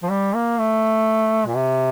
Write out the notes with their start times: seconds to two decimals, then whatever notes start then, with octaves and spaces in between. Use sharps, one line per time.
0.03 F3
0.10 G3
0.35 A#3
0.59 A3
1.47 A#2
1.56 C3